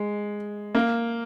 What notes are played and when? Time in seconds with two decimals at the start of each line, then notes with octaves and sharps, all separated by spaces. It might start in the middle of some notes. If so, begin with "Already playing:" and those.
Already playing: G#3
0.75 A#3